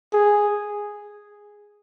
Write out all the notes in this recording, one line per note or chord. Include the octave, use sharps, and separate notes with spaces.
G#4